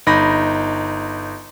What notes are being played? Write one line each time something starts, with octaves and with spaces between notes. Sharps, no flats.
G1 D#4 B5 A#6